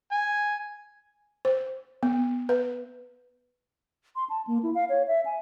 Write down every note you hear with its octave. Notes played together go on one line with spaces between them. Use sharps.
G#5
C5
B3
B4
C6
A5
A#3
E4
F5
C#5
E5
G#5